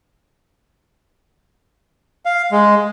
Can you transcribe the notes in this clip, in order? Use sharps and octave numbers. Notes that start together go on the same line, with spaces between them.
F5
G#3